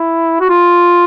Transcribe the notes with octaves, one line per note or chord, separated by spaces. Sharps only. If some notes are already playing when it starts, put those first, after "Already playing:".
Already playing: E4
F#4
F4